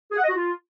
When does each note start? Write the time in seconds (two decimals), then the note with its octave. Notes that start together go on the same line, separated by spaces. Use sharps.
0.11 G#4
0.17 F#5
0.23 D#5
0.29 F#4
0.35 F4